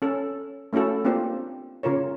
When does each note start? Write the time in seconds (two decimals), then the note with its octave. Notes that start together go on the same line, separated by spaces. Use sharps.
0.02 C#4 A4
0.73 A3 C#4 E4 F#4 A4
1.05 A#3 C4 D4 F4 G4
1.83 C#3 F4 A#4 C#5